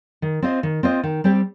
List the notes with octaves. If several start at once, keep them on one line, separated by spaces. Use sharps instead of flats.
D#3
C4 F4 C5 D#5
D#3
C4 F4 C5 D#5
D#3
G3 C4 G4